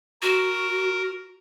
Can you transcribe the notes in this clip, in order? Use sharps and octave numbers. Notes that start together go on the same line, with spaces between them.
F#4 A#4